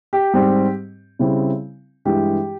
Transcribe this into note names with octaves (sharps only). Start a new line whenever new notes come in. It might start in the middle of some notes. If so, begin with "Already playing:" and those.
G4
G#2 G3 C4
C#3 G3 C4 E4
G2 E3 G#3 E4 G4